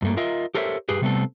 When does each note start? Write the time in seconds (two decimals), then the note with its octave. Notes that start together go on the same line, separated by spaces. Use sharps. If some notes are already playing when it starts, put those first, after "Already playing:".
0.02 G2 A3 A#3
0.17 F4 A#4 D#5 E5
0.55 G4 A4 A#4 C5 C#5 E5
0.89 G2 G4 G#4 B4
1.01 C3 G3 A3 B3 C4 A4